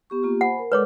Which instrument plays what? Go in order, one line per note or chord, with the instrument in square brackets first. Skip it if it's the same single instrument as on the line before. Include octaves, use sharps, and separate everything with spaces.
[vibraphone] B3 G4 C#6
A#3 F4 G4
[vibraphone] C5 G#5 B5 [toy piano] F#5
[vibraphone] A#4
[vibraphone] G#3 A4 D5 [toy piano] B4 C#5 D6